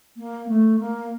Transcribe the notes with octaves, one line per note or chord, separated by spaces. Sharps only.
A#3
A3
A#3